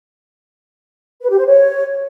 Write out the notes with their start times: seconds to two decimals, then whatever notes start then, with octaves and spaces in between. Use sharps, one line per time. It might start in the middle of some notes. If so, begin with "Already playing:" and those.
1.21 B4
1.30 G4
1.38 C5
1.47 C#5